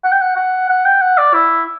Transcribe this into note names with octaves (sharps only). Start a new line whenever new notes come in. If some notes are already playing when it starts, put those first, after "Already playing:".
F#5
G5
F#5
F#5
F#5
G5
F#5
D5
E4